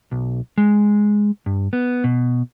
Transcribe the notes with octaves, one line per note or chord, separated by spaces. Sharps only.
B1
G#3
G2
B3
B2